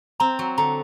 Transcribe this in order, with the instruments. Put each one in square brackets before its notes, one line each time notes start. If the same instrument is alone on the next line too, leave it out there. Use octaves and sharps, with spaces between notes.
[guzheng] C4 [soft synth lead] A#5
[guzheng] F#3
[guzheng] D3 [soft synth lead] A#5